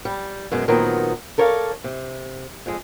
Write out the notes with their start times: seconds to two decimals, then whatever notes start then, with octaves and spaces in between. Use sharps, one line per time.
0.05 G3
0.51 F#2 B2 G#3
0.68 A#2 D#3 F#3 B3 C4 A#5
1.38 A4 A#4 C#5 D5 F5
1.84 C3
2.66 F2 G#3